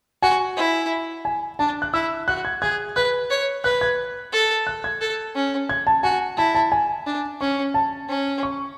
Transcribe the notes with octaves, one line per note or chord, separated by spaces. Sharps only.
F#4 G#5
E4
G#5
D4 A5
F#6
E4 E6
F#4 F#6
G#6
G#4 G#6
B4 F#6
C#5
B4 F#6
G#6
A4
F#6
G#6
A4
C#4
G#6
A5
F#4 G#5
E4 A5
A5
G#5
D4
C#4 C#6
A5
C#4
C#6